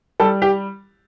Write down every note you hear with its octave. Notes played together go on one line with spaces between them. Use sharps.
G3 A4
G4